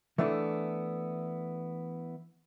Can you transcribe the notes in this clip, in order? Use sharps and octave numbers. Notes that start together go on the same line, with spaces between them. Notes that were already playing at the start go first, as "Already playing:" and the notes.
E3 A3 B3 D4 E4